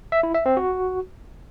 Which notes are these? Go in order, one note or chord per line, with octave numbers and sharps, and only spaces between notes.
E5
E4
E5
C4
F#4